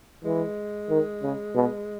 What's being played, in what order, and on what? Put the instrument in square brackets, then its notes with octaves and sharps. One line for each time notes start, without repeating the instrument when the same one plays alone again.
[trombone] E3 [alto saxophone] G#3
[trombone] D#3
C#3
B2